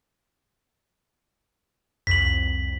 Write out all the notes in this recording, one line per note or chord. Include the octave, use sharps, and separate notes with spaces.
C2 F2 B6 F#7